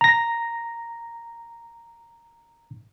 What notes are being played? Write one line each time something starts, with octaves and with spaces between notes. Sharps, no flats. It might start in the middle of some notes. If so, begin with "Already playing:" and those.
A#5 A#6